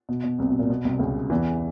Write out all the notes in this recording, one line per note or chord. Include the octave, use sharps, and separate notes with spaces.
B2
B2
C2 C3
B2
A#2
B2
C2 C3
C#2 C#3
E2 E3